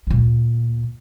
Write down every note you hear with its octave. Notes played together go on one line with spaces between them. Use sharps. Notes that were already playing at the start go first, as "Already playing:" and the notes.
D2 A#2